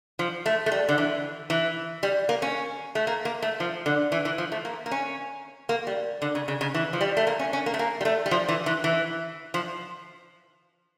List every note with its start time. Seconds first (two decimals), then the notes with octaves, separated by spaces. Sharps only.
0.19 F3
0.46 A3
0.66 A3
0.72 G3
0.89 D3
0.98 E3
1.50 E3
2.03 G3
2.29 A#3
2.42 C#4
2.95 A3
3.07 A#3
3.25 A#3
3.42 A3
3.60 F3
3.86 D3
4.12 E3
4.25 E3
4.38 F3
4.52 A3
4.65 A#3
4.86 A#3
4.91 C#4
5.69 A#3
5.87 G3
6.22 D3
6.35 C#3
6.48 C#3
6.61 C#3
6.74 E3
6.93 F3
7.01 G3
7.17 A3
7.27 A#3
7.39 C#4
7.53 C#4
7.66 A#3
7.74 A3
7.79 A#3
8.01 G3
8.05 A3
8.26 G3
8.31 F3
8.49 E3
8.66 E3
8.84 E3
9.54 F3